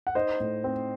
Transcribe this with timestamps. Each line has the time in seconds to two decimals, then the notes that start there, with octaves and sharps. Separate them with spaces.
0.07 F#5
0.15 D#4 C5 D#5
0.40 A2
0.64 C4